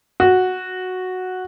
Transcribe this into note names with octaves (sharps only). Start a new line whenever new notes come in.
F#4